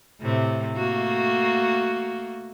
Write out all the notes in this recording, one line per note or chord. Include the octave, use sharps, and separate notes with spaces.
A2 C3
A3 A#3 F#4